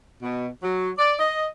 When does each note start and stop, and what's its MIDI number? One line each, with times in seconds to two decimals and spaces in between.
0.22 0.48 47
0.63 0.90 54
0.98 1.14 74
1.19 1.46 75